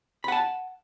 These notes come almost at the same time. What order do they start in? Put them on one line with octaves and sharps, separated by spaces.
B5 F#5 A5